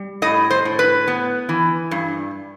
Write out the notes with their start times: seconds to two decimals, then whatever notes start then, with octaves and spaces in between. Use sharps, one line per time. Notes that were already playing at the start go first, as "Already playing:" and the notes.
Already playing: G3
0.22 A2 D#5
0.50 C5
0.65 A2
0.79 B4
1.08 B3
1.49 E3
1.91 G2